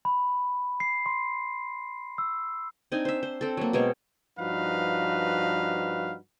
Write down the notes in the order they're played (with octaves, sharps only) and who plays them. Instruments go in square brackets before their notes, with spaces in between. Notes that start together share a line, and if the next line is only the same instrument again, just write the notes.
[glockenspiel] B5
C7
C6
E6
[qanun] C4 D4 D#4 G#5
C5 E5
C5
C4 A4
F#3 A#3
B2 G#3 C4 C#5
[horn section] G2 F3 D#4 F#4 B4 F5